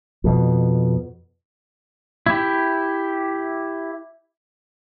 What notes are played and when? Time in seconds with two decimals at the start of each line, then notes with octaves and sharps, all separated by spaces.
0.24 F2 B2
2.26 E4 G4